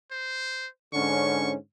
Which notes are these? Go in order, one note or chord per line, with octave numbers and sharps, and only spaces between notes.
C5
G#2 D3 C#4 C#6